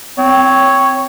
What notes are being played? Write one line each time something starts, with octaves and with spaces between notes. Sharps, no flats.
C4 C#5